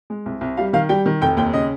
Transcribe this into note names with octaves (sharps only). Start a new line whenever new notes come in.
G#3
C2
C2
G3 F5
D#3 F5
G3 G5
D#3
F1 G5
D#2 G5
C#3 D#5